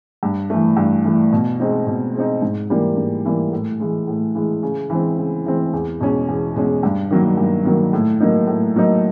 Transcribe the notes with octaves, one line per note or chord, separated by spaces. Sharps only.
G2
E3 A3
G2
E3 A3
B2
G#3 C4 D#4
B2
G#3 C4 D#4
G#2
E3 G3 A#3
G#2
E3 G3 A#3
A2
E3 G#3
A2
E3 G#3
C#3
E3 G#3 C4
C#3
E3 G#3 C4
E2
B2 G#3 C#4
E2
B2 G#3 C#4
G2
D#3 F#3 A#3
G2
D#3 F#3 A#3
A2
F#3 A#3 D#4
A2
F#3 A#3 D#4